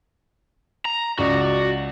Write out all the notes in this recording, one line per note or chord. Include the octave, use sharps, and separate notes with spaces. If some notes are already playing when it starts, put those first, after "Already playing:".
A#5
C#2 F#4 D5